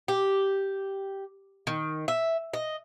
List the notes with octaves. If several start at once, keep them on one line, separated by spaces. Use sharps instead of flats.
G4
D#3
E5
D#5